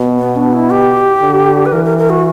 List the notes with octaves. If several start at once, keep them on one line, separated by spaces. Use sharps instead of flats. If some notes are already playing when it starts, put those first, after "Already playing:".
Already playing: B2
B3
D4
E4
G4
D3
B4
E3 A#4
A#4
A#4
F#4